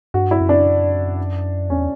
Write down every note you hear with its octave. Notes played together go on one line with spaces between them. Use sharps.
G2 F#4
E4
F#2
D4
E2 C#4